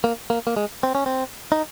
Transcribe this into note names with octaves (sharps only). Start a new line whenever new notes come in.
A#3
A#3
A#3
G#3
C4
C#4
C4
D#4